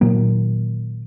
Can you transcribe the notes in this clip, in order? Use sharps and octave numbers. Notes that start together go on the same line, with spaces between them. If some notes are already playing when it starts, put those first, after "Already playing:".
A#2 D#3 F#3 A#3